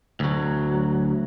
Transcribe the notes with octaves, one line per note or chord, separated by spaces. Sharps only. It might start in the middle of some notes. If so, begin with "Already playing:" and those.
D2 F#3